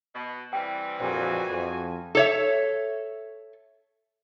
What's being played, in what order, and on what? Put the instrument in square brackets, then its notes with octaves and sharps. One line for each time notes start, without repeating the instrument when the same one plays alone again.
[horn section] B2
[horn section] E3 G3 C4 [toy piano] G5
[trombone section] A#1 F2 A#2 [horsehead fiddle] F#4 G#5 [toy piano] C5
[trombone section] F2
[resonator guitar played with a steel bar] A4 C#5 E5